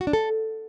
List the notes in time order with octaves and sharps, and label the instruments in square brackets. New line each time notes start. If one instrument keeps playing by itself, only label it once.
[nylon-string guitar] F#4
D4
A4